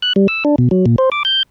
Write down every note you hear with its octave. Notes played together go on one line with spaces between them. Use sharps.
F#6
G3
E6
D4
B2
F#3
A#2
C5
D6
G6